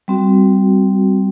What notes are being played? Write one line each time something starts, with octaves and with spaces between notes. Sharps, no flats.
G3 C4 F#4